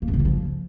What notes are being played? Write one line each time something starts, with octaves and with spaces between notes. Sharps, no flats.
A#3
F#2
C#3
E3
F3